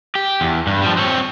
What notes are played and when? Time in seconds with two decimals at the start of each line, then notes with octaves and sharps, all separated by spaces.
0.15 G4
0.41 E2
0.67 G2
0.82 F3 G3
0.97 C4 C#5